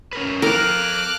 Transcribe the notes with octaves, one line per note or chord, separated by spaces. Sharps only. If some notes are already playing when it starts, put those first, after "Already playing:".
C#4 A#4 B4
A4 A#4 F5 D6 F6 F#6